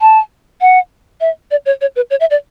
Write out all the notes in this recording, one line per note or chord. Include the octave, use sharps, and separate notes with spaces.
A5
F#5
E5
D5
C#5
C#5
B4
C#5
E5
D5